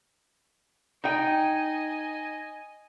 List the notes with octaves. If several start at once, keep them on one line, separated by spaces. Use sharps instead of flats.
D#4 D#5 G5 G#5